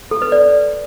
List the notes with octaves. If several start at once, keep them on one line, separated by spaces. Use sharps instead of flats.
A4
B4
D5